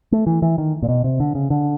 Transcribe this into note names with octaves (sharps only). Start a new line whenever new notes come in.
A3
E3
E3
D#3
A#2
B2
C3
D3
C#3
D3